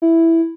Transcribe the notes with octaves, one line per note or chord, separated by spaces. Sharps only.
E4